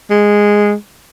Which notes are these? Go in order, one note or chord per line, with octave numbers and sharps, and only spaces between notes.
G#3